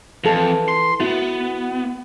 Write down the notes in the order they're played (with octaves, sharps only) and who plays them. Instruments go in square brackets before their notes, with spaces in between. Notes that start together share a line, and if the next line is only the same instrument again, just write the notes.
[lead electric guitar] F2 [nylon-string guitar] E3 A4
[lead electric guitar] C6
[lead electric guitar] B3 [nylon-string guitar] E4 F#4